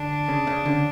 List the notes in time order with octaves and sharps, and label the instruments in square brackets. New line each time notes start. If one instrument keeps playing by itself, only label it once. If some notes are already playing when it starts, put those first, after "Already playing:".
Already playing: [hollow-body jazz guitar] D3 [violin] D4
[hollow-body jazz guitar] C#3
C#3
D3